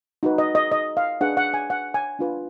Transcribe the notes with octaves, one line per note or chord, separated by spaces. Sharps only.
D#4 F#4 B4
D#5
D#5
D#5
F5
D4 G#4 B4 F#5
F#5
G#5
F#5
G#5
D4 F4 B4